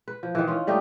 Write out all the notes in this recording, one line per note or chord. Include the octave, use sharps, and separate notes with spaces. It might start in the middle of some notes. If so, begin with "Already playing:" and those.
B4
F3
D#3 E3
C#4 F4
G3 A3 D#4 G4